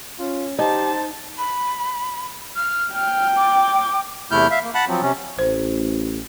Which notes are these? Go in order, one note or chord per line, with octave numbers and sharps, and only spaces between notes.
C#4 F4
D#4 G4 C5 A5
B5
F6
G5 F6
D6
E2 C3 A3 E4 F6 G6
E5 F5
A#3
F#5 A5 B5 F#6
F3 F#3 C4
C3 C#4
A1 C5